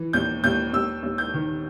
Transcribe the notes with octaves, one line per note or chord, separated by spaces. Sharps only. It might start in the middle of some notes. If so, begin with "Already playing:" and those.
Already playing: E3
D#2 G6
D#2 G6
D#2 E6
D#2
G6
D#3